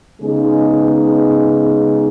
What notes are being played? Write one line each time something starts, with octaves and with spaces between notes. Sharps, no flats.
C#3 G#3 B3 D#4 G#4